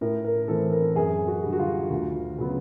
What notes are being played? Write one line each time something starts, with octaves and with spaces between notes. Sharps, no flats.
A2 A#4
A#4
E3 A3 C4 A4
A#4
F#2 G#4
F#4
D3 G3
F#4
F4
D2
C#3 F#3 B3